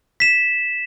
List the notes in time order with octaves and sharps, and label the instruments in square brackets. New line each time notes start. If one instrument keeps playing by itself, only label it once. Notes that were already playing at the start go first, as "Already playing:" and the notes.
[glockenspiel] B6 E7